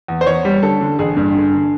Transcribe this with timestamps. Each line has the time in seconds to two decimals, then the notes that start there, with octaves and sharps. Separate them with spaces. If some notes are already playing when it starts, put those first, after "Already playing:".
0.08 E2
0.21 C5
0.26 E2 C#5
0.45 G3
0.62 D3 A4
0.81 D3
0.99 A1 G#4
1.17 G2
1.35 D3
1.53 D3